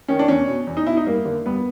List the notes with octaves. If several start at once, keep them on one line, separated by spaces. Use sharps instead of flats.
D#3 C#4
D4
E2 C#4
B2
E2
D#4
B2 E4
D#4
G2 A#3
D3
G2 B3